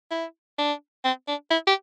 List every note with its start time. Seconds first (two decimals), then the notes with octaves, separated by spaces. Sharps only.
0.11 E4
0.58 D4
1.04 C4
1.28 D4
1.50 E4
1.67 G4